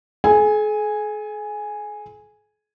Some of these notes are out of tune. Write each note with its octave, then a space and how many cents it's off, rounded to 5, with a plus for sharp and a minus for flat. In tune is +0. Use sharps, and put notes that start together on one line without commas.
G#4 +45 G#5 -5